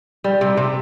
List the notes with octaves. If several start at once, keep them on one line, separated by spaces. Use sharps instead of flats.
G3
C3
C3